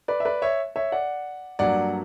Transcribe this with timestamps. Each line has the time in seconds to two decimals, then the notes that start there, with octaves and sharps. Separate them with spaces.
0.08 B4 D5
0.20 E5
0.25 B4 D5
0.42 C#5 E5
0.76 C#5 E5
0.92 D5 F#5
1.59 G2 F#3 A#3 D5 F#5